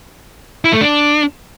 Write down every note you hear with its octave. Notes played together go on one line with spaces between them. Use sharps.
E4
A3
D4